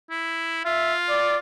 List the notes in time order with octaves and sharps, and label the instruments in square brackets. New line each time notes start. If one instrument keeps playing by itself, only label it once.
[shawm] E4
[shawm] F4 [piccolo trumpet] E5
[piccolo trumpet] D5